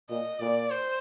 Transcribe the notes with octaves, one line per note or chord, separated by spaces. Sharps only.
A#2 D#5
A#2 D5
C5